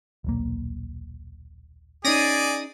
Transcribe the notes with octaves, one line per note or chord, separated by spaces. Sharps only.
D#1 B1 A#3
C#4 D#4 G#4 D5 A#6 D#7